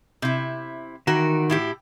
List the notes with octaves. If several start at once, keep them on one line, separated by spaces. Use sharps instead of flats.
C3 E4
D#3 E3 F#4 A#4
A2 E4 G4